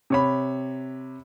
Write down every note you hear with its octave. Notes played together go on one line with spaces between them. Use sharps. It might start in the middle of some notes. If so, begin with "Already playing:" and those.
C3 C#5 B5